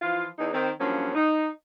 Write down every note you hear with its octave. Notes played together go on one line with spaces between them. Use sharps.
E3 F3 F4
E2 D#4
D#3 C4
G2 F3 F#3 A#3 C#4
D#4